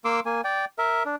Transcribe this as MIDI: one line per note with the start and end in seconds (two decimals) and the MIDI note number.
0.05 0.20 58
0.05 0.20 84
0.05 0.20 86
0.05 0.20 88
0.26 0.41 58
0.26 0.41 80
0.44 0.65 74
0.44 0.65 79
0.78 1.03 70
0.78 1.03 76
1.06 1.16 62